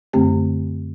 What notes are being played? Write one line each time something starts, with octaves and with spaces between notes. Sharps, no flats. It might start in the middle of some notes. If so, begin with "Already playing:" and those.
F#2 D3 A3 C4 G4